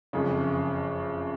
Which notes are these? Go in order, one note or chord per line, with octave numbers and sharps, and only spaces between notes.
F#1 F2 C#3